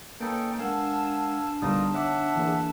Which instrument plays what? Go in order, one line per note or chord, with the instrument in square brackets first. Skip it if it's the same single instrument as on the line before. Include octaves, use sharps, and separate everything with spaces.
[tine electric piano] A#3 [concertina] C#4 D#4 A4 [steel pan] B4 [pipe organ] G5
[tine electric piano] G#3 A#4 F#5 [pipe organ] D4 A5 [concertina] F5 G#5 E6
[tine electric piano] A#1 G3 D#6 [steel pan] D3 B3 D#4 [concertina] F4 A#4
[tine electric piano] C#5 D6 [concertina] E5 F#5
[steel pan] E3 A#3 G#4